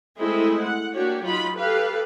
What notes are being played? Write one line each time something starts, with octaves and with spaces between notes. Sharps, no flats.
G#3 A3 C4 E4 G#4 D#5
F#5
A#3 D4 F#4 G4 C#5
F#3 D#4 F4 B5
G4 A4 B4 F5